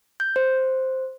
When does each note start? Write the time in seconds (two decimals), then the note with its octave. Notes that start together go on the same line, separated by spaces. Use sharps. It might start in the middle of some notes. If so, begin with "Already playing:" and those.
0.20 G6
0.36 C5